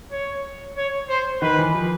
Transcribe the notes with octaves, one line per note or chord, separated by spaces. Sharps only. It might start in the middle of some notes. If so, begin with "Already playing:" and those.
C#5
C#5
C5
D#3 B4
E3
F3